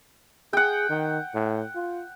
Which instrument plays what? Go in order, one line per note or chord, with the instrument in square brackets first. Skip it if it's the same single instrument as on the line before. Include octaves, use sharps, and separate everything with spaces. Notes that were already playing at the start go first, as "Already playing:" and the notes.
[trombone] G#4 [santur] F#5 G5
[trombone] D#3
A2
F4